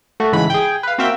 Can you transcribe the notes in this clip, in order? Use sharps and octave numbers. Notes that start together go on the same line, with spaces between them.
A3 F#4
G#2 C#3 E3 G#3 B5
G#4 G5
B4 F5
A#3 C4 F#4 E5 F5 G5